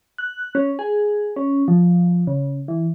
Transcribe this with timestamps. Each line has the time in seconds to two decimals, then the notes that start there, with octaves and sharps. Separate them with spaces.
0.18 F#6
0.55 C#4
0.79 G#4
1.36 C#4
1.68 F3
2.27 C#3
2.68 E3